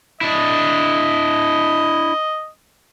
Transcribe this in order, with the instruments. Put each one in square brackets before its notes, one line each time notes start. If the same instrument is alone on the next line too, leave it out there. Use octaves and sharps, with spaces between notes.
[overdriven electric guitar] D4 E4 [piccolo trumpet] D#5